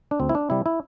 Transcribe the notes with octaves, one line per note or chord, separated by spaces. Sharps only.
D4
D2 C4
E4
D4
C3 G3 E4
E4